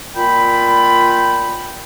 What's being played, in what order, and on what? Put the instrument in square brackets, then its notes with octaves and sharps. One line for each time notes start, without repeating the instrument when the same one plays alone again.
[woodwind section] A#2 F4 G5 B5